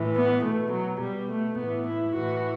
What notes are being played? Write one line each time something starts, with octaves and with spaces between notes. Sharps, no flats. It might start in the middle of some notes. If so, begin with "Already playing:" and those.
Already playing: A2 E3
B3
B2 A3
F#3
B2 G3
A3
A2 E3 B3
E4
A2 E3 F#4